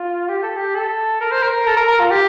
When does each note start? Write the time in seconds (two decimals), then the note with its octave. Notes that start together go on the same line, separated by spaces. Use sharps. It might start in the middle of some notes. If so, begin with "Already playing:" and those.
Already playing: F4
0.29 G4
0.43 A4
0.57 G4
0.75 A4
1.21 A#4
1.32 C5
1.43 A#4
1.67 A4
1.77 A#4
1.88 A#4
2.00 F4
2.11 G4